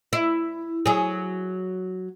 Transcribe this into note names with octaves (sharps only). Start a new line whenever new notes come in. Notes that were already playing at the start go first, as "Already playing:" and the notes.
E4
F#3 G#4